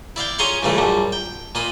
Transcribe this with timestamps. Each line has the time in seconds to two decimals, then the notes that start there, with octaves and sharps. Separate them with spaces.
0.16 E4 D5 F5 G5
0.38 C#4 F4 G#4 A#5 C6 C#6
0.63 A#1 G2 C#3 E3 A3 A#3
0.78 A#1 F#2 G3
1.12 G5
1.55 A#2 A#3 D#5 B5